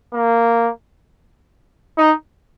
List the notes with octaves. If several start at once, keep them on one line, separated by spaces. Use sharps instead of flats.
A#3
D#4